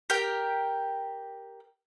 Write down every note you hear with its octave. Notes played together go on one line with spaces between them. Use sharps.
G4 A#4 G5